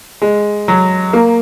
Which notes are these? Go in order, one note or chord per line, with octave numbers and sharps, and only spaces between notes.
G#3
F#3
A#3